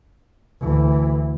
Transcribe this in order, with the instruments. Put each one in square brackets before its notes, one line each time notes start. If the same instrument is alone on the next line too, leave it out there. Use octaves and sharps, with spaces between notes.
[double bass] D2 E3